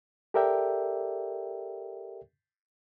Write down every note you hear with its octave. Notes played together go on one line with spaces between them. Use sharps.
G4 A4 A#4 D5 E5 G5